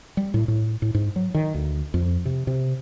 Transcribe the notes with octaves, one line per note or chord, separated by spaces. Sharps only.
G3
A2
A2
A2
G#2
F#3
D#3
D2
F2
C3
C3